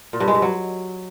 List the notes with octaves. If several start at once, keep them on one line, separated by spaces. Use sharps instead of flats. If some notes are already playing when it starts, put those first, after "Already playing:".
A#2
G2
G#3
G2
F#3